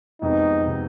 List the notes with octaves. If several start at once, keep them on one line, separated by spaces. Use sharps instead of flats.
F2 C3 D#3 G#3 B3 D#4
C3 D#3 G#3 B3